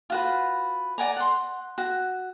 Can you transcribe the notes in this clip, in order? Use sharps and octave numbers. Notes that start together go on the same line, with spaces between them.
F4 F#4 B4
D5 F#5 G#5 A#5
F#5 C6
F#4